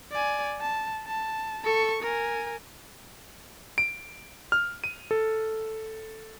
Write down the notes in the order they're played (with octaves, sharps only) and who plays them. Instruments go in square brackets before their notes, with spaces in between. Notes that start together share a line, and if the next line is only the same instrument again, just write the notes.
[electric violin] D5 G#5
A5
A5
A4 C#6
A#4 G#5
[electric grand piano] D7
F6
D#7
A4